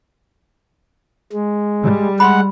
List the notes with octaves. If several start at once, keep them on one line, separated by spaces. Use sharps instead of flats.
G#3
G3
G#3 F#5 B5 C6